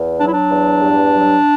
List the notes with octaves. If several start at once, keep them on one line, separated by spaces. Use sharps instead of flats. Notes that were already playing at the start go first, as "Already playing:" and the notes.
Already playing: E2
F#3 D4
E4
D4
E2
G2
F#3